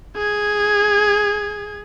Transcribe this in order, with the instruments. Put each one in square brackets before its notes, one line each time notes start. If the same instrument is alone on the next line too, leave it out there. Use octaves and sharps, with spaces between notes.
[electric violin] G#4 G#6